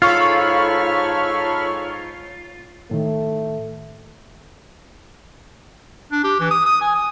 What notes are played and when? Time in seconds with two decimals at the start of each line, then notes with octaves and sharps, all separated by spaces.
0.02 G#2 F4 A4 C#5 B5 C#6 F6
2.91 A2 D#3 A3
6.12 D4
6.24 G4
6.40 E3
6.51 D#6
6.66 D#6
6.81 G#5
6.96 D#6